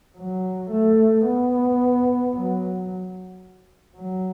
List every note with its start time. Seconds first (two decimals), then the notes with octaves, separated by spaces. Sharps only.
0.17 F#3
0.71 A3
1.25 B3
2.34 F#3
3.96 F#3